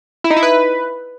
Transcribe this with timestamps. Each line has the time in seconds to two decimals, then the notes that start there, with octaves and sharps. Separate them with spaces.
0.24 E4
0.30 D#4
0.37 E4
0.43 B4